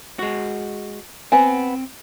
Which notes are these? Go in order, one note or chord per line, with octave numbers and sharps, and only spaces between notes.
G#3 F#4
B3 C4 G#5